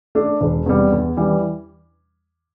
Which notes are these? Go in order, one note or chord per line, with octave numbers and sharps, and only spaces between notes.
A3 D4
E1
E2 C3 G3
E2
E3 G3